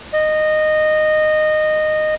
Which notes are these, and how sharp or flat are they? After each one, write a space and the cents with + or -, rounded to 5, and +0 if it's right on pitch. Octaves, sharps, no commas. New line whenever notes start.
D#5 -15